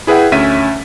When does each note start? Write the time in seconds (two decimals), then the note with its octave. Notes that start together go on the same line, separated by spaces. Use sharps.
0.07 E4 G#4 B4 E5 F#5 G5
0.32 D2 C#4 E5 B6 D#7